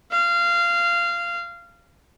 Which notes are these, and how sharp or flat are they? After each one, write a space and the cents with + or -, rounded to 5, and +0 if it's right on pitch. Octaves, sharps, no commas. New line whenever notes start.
F5 -20